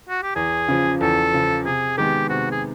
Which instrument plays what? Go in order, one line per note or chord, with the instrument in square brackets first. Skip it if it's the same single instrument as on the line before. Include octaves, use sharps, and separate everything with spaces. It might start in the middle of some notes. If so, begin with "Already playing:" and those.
[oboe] F#4
G4
[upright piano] E2 [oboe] G#4
[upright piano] C#3 F3
[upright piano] E2 [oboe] A4
[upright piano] C#3 F3
[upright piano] C3 [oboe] G#4
[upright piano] D#3 G#3 B3 [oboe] G4
[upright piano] C3 [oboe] F#4
[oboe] G#4